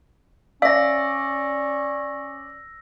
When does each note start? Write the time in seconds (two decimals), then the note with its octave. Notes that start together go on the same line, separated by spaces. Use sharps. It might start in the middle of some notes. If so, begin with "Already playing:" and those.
0.62 C#4 D5 E5 F5 E6 A#6